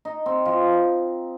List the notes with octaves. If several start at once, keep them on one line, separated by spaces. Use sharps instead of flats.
D#4
C4
F3